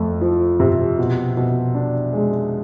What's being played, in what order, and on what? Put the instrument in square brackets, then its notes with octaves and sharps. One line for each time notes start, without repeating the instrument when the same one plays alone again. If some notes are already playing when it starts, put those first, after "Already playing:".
Already playing: [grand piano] F2 A3
F3
C3
B2
B2
D4
G#3